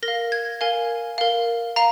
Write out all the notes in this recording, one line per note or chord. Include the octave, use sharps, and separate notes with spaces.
A#4 A#6
F5
G#6
A#4 F5 G#5
A#4 F5
F5 A#5